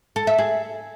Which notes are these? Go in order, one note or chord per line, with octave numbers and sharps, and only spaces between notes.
A4
E5
G#4